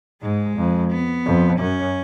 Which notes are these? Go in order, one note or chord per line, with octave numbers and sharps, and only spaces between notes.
G#2 G#3
F2
B3
F2
F#2 C#4